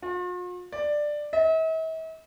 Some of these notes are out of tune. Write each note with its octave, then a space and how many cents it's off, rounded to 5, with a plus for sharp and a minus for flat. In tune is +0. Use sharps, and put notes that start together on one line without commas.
F4 +45
D5 +10
E5 -45